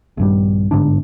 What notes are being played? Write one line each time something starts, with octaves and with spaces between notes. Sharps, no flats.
A#1 G2 G3
G1 G#2 D3 D4